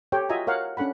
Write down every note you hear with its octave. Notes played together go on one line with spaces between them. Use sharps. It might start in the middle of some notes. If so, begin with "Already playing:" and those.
G4 A4 C#5 G5
F4 F#4 D#5 E5 G#5 A#5
A#4 C#5 F5 F#5
C#4 D4 A4 F#5 B5